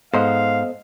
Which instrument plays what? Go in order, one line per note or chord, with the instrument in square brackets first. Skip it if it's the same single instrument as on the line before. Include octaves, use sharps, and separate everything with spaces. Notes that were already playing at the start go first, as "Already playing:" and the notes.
[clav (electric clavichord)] G#2 [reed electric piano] B3 D#5 [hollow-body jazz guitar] A4 C5 [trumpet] F5